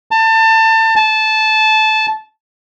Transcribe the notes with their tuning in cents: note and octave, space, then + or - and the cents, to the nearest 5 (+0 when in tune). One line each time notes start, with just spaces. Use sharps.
A5 +25
A5 -15